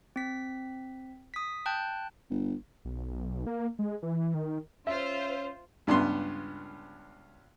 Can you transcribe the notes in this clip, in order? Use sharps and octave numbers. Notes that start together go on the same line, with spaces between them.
C4 B6
D#6 B6
G5 A5 F#6 G6
G1
B1
A#3
G#3
E3
D#3
C#4 F4 C5 E5
C#2 G2 B3 C6